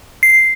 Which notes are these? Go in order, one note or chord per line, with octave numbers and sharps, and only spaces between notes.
C7